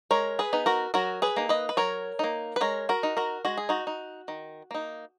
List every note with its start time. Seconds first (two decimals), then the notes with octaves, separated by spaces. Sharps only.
0.11 G#3 A#4 C#5
0.39 G#4 B4
0.53 B3 D#4
0.66 F#4 A#4
0.94 F#3 F#4 A#4
1.22 G#4 B4
1.36 A#3 D#4
1.49 B4 D#5
1.69 B4
1.77 F#3 A#4 C#5
2.19 A#3 D#4
2.56 B4
2.61 G#3 A#4 C#5
2.89 F#4 A#4
3.03 D#4
3.17 F#4 A#4
3.45 G#3 F#4
3.57 G#4
3.69 D#4 F#4
3.87 D#4
4.28 D#3
4.71 A#3 D#4